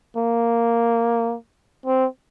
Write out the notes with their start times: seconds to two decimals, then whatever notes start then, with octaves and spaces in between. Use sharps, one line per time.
0.16 A#3
1.86 C4